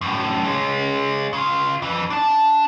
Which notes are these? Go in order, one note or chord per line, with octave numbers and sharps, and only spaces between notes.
F#2 A2
G#3 C#4
C#3 F4
F2 E3
D4 A5